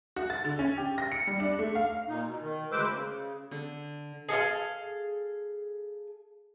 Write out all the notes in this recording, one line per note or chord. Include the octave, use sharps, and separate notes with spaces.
F#4
A6
D3
C#4
G4
A#6
C#7
G3
D4
A3
F5
A#2 D#4
B2
D#3
D2 G#3 B4 C5 D6 E6
C#3
D3
G#4 A4 E5 F5